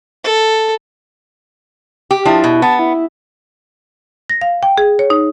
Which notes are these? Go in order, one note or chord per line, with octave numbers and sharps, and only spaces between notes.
A4
G4
F3 D4 E4
B2
B3 A5
E4
A#6
F5
G5
G#4
C#5
D#4